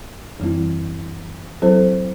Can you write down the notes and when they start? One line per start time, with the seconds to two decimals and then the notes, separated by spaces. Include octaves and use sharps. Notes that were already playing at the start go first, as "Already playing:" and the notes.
0.40 F#2 E3 G3 C4 E4
1.62 F#3 C4 E4 A4 C5